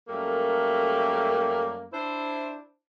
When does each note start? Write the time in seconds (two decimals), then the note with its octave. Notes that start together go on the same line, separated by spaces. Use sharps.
0.08 F#2 G3 A3 A#3 A4 A#4
1.92 D4 E4 C5